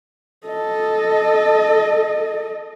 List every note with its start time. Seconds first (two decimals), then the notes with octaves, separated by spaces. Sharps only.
0.47 A4 D#5